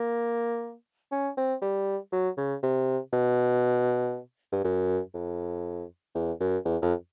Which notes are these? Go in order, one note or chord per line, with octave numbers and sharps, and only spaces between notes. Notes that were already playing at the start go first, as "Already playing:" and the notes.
Already playing: A#3
C#4
C4
G3
F#3
C#3
C3
B2
G2
F#2
F2
E2
F#2
E2
F2